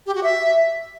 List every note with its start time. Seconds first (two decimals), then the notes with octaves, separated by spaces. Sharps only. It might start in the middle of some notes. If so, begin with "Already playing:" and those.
0.06 G4
0.15 F#4
0.23 E5